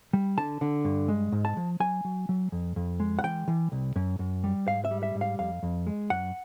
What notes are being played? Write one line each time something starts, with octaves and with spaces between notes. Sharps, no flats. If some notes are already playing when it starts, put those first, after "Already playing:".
G3
D3 A5
D3
G2
G#3
G#2
A5
F3
F#3 G#5
F#3
F#3
F2
F2
G#3
F#5
E3 G5
E3
C2
F#2
F#2
G3
G#2 F5
E5
G3
E5
G#2
F5
F2 F5
F2
G#3
F#2 F#5